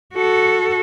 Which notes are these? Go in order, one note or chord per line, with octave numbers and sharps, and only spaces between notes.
F#4 A4